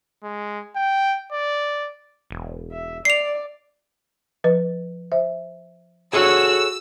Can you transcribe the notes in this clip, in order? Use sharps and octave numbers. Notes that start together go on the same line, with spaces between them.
G#3
G5
D5
E1
E5
D5 C7 F7
F3 B4 D#5
C5 E5
F#4 G#4 A4 C#5 E6